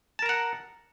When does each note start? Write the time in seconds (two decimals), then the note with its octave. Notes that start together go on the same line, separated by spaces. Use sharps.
0.19 A5
0.22 A#4
0.26 A#5
0.29 F#5